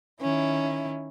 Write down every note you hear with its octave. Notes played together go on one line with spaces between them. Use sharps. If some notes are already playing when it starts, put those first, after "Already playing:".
D#3 C#4 E4